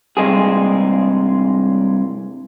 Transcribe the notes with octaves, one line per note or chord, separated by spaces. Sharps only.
C2 G2 G#3 C4 G#4